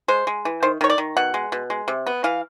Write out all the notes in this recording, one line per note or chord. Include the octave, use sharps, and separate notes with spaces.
G#3 C5
G#3
E3
D#3 C5
D#3 C#5
D5
D#3
B2 F#5
G#3
B2
G#3
C3
B3
E3 F5